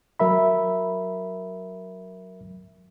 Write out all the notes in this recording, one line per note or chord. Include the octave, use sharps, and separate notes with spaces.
F#3 A#4 E5 B5